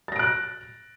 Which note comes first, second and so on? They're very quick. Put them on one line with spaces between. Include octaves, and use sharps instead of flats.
A6 A#6 D7 F#6